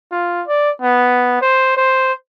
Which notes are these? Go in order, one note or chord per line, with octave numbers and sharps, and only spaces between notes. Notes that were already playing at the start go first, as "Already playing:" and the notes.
F4
D5
B3
C5
C5